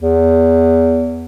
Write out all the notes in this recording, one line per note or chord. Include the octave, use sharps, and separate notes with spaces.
E2